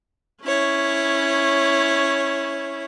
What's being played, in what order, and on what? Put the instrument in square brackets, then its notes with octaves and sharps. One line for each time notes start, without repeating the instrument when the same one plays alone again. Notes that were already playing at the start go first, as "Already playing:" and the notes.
[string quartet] C#4 E4 C#5